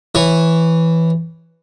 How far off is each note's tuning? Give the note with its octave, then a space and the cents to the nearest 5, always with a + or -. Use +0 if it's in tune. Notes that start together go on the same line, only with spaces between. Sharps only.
E3 +0 C#5 -10